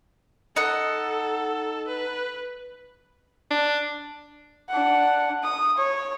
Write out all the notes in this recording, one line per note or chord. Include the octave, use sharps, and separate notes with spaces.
D#4 A4 F#5
B4
D4
D4 F#5
D#6
C#5